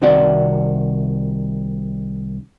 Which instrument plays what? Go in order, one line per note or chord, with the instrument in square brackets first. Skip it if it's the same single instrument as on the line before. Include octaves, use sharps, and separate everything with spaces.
[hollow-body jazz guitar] C2 C3 D#3 F#4 D5